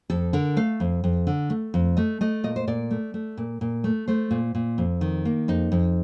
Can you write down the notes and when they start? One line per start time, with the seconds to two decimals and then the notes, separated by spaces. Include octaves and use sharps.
0.10 F2 A4
0.33 D3 A#4
0.57 A3 F5
0.80 F2
1.04 F2
1.27 D3
1.50 A3
1.74 F2
1.97 A3 D#5
2.21 A3 D#5
2.44 A#2 D#5
2.56 C5
2.68 A#2 D5
2.91 A3
3.14 A3
3.37 A#2
3.61 A#2
3.84 A3
4.08 A3 C5
4.31 A#2
4.55 A#2
4.78 F2
5.01 D#3
5.25 A#3
5.48 F2 D#4
5.72 F2